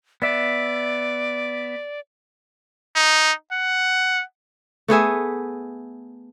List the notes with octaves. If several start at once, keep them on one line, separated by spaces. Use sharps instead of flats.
B3 D5 E5
D#4
F#5
A3 B3 G#4 E5